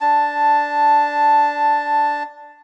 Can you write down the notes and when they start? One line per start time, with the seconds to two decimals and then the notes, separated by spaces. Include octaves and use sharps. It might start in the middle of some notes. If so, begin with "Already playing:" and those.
0.01 D4 A5